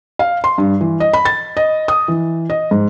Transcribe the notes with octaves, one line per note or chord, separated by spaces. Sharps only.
F5
C6
G2
E3
D#5
B5
A6
D#5
D#6
E3
D#5
G#2